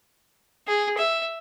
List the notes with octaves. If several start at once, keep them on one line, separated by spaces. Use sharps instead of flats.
G#4
E5